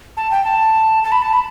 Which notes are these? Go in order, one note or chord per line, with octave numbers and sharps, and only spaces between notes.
A5
G5
A5
A5
B5
A5
B5